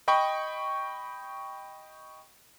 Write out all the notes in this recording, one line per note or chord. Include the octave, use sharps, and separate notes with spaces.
D#5 G5 B5 C#6